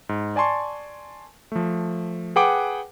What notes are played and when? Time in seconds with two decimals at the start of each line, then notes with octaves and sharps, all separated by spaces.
0.09 G#2
0.36 D5 G#5 A5 C6 C#6
1.52 F3 A3
2.36 G#4 B4 F#5 G5 D6